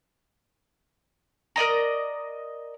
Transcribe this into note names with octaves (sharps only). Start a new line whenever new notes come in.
A#4 D5 D#5 A#5